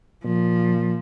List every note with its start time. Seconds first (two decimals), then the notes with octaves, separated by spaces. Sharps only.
0.25 A#2 F3